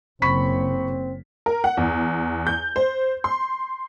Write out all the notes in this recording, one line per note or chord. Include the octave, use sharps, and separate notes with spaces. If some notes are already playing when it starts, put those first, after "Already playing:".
F#1 C#3 C4 B5 C#6 B6
A#4
F#5
E2
G6
C5
C6